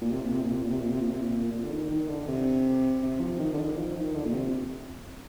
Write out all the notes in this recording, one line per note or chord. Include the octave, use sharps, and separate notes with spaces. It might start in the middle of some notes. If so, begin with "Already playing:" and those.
A#2
C3
A#2
C3
A#2
C3
A#2
C3
A#2
C3
A#2
C3
A#2
A#2
D3
D#3
D#3
D3
C3
C3
F3
D#3
D3
D#3
F3
D#3
D3
A#2
C3